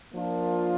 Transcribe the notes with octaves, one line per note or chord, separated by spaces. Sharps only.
F3 A#3 D4 F4 A#4